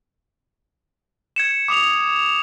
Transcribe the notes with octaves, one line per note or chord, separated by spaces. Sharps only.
G#6 C#7 E7
D6 D#6 F7